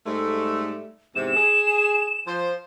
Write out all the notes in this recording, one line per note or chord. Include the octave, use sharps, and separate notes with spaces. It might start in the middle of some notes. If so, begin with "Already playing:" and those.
G#2 G3 A3
E2 G#2 C3 E7
G#4
F3 C5